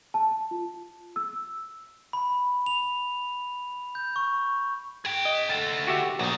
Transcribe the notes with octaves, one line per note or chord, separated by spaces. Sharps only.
A5
F4
E6
B5
F7
G6
C#6
G#4 G5
D#5
D2 A4
F#4 G4 E5
A#1 F#3 D#4